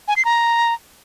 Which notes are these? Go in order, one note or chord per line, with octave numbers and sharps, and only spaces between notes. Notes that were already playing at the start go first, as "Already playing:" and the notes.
G#5
C7
A#5